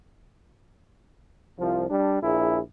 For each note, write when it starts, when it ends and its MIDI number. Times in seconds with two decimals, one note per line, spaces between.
1.57 1.85 36
1.57 1.85 53
1.89 2.19 55
1.89 2.19 62
2.22 2.58 34
2.22 2.58 64
2.22 2.58 68